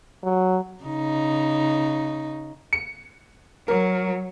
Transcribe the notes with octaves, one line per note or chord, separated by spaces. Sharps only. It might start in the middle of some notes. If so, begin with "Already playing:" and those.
F#3
C#3 D#4
C#7
F#3 A#4